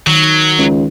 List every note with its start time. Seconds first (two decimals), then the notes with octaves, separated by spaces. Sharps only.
0.07 D#3 F#3
0.58 C#2